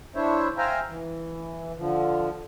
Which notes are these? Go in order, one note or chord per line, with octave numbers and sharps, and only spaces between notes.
D4 E4 C5 C#5 E5
C5 E5 F5 G5 G#5 A#5
E3
D3 F3